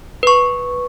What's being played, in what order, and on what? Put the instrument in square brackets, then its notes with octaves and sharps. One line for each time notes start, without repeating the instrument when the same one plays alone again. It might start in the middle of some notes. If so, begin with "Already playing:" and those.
[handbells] B4 C#6